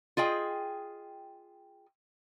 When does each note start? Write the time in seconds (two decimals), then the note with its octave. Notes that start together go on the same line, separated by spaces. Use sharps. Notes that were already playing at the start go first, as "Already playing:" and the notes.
0.17 F4 G#4 D#5 G5